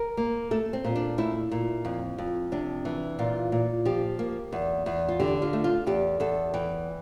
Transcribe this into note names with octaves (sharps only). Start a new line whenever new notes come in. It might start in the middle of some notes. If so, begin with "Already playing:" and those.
Already playing: A#4
A#3
A3 A4
C4
A#2
D4
A3 E4
A#2
F2
F2
C3 D4
E3
A#2 F4
A#2
F3 G4
A#3
E2
E2
F4
D3 G4
F4
A3
F4
E2 G4
E2 A4
E3 G5